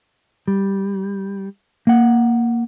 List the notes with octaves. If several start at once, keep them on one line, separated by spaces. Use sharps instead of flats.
G3
A#3 F#5